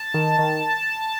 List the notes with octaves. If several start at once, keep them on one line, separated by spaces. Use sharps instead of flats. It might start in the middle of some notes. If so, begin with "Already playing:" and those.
Already playing: A5
D#3
D#3